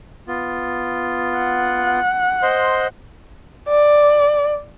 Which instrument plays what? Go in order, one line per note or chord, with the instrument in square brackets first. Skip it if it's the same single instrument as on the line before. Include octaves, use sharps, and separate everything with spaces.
[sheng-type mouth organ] B3 F4
[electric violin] F#5
[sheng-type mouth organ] C5 D#5 C6
[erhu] D5